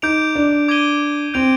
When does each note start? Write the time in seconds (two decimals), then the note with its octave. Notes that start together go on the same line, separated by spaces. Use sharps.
0.02 D#4 D6 G6 D7 F7
0.35 D4
0.68 D6 G#6 D#7 G7
1.34 C4 G6 D7 F7